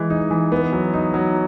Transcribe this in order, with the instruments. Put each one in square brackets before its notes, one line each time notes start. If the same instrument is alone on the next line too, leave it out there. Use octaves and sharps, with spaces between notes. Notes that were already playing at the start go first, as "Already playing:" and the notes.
Already playing: [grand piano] E3 G#3
D#4
E3
B3
F#3
D#4
F#3